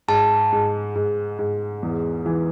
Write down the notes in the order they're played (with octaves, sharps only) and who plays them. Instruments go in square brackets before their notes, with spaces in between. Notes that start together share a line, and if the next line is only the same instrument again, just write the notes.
[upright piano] G#2 [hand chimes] A5
[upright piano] G#2
G#2
G#2
E2
E3